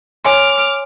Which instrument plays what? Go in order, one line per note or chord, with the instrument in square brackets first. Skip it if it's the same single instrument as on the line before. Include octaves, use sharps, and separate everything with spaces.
[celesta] C#5 G#5 C6 [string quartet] D6 F6